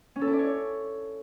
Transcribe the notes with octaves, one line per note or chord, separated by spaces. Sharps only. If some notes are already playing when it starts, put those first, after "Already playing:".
C#4
A4
E4
D5
C#5